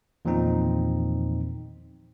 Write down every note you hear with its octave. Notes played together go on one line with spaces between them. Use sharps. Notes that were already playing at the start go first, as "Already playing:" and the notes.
E2 A#2 D#3 F3 C4 D#4